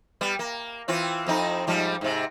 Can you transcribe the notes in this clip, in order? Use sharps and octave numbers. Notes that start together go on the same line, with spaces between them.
G3 B3
A#3
E3 C4 F4
F2 C4 D#4
G#2 F3 G3
G#2 C3